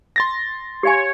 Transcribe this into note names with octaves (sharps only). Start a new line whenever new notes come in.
C6 A6 A#6
G4 C#5 F5 G#5